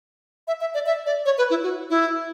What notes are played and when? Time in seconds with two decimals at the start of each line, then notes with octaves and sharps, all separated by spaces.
0.48 E5
0.61 E5
0.74 D5
0.86 E5
1.06 D5
1.25 C#5
1.38 B4
1.50 E4
1.63 F#4
1.90 E4